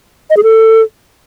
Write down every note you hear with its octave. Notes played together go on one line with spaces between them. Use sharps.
D#5
G#4
A4